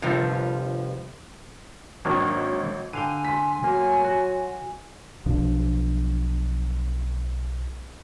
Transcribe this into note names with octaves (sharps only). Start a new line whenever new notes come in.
G1 D#2 C3 F3 G3 A4
G#1 D#3 F#3 A#3 D4 C#5
D3 F5 G5 G#5 D#7
C6 B6
F#3 A#3
F#4
B1 B2 F3 D4